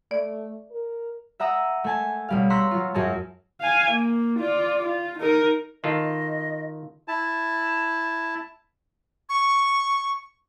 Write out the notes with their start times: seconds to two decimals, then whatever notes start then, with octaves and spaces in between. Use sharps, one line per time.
0.11 A3 D5
0.71 A#4
1.40 E5 F#5 A#5 D#6 E6
1.84 A3 A4 G#5 A5
2.28 B1 G3 F5
2.50 A#5 C6 C#6 E6 F#6 B6
2.71 F#3 F4
2.94 F#2 F#3 G#4 C#5 A5
3.60 F5 G#5
3.90 A#3
4.38 F4 D5
4.83 F4
5.18 D#4 A#4
5.84 D#3 F4 A4 D#5
7.08 E4 A5
9.29 C#6